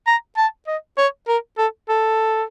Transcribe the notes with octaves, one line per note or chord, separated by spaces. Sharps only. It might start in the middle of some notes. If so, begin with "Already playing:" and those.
A#5
A5
D#5
C#5
A#4
A4
A4